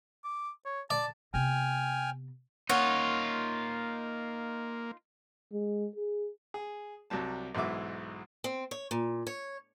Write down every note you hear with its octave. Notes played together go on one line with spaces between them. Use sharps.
D6
C#5
D5 A5
C3 B3 G5 G#5 F6
A#3 D#4 F4 C#5 F#5
G#3
G#4
G#4
C2 F#3 G3 A5
B1 G#2 E3 F#4 E5 D6
C4
C#5
A#2
C#5